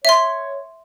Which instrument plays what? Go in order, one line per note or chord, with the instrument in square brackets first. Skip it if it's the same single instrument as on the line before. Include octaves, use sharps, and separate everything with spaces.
[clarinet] C#5 [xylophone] E5 C6